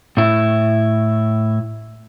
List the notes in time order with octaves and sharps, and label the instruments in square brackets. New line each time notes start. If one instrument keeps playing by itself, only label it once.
[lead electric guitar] A2 E4